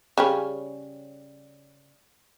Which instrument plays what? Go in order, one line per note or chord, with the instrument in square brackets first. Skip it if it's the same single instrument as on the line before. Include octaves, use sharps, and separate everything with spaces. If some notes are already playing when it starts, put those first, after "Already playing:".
[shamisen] C#3 G3 C#4